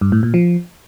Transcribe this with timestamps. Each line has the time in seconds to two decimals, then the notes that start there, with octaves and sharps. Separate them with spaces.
0.01 G2
0.12 A2
0.23 A#2
0.34 F3